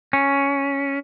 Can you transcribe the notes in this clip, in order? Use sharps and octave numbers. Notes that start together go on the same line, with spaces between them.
C#4